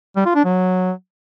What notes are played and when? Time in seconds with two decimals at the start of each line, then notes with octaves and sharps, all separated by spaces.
0.16 G3
0.26 F4
0.35 D4
0.45 F#3